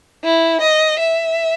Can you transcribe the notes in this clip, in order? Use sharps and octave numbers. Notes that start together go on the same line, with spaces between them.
E4
D#5
E5